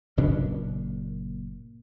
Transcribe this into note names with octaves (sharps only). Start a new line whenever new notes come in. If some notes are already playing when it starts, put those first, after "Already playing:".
F#1 A#2 C#4 D4